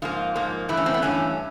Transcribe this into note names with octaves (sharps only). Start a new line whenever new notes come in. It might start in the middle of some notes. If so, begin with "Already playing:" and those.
G#2 F3 A#3 F4
G#2 F3 A#3
G2 E3 A3 E4
C#4
C4
B3
G2 E3 A3 C#4